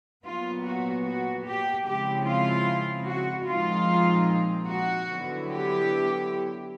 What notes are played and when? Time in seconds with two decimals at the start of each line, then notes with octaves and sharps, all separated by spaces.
0.25 A#2 F#3 B3 F4
0.65 F#4
1.05 F#4
1.45 G4
1.85 C#3 F3 G#3 C4 E4 G4
2.26 F4
3.07 F#4
3.47 A#2 F3 G#3 C4 D#4 F4
4.69 F#4
5.09 D3 F#3 B3 E4
5.49 G4